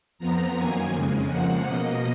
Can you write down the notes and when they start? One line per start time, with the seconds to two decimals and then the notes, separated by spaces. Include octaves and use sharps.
0.19 F2 F3 B3 A#5
0.55 F#2 D#3 A#3 G#5
0.92 F2 C#3 G#3
1.28 C#3 F3 A#3 F#5
1.65 B2 A#3 D#5